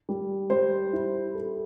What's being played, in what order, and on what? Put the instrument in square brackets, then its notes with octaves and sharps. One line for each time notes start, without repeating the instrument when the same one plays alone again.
[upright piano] G3
[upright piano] G3 [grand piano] C5
[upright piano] E4
A4